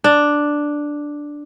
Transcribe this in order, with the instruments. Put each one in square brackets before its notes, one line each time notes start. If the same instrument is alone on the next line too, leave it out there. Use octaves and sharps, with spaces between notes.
[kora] D4